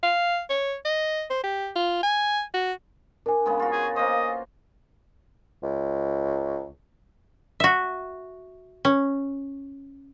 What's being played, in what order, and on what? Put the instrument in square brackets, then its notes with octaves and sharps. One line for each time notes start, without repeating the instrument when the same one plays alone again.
[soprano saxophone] F5
C#5
D#5
C5
G4
F4
G#5
F#4
[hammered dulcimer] D4 [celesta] A#4 G#5
[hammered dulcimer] C#3 G#3 B3
F4 F#4
[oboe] G#4
[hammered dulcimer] A#3 C5 [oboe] D#5
[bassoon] C#2
[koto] F#4 E5
C#4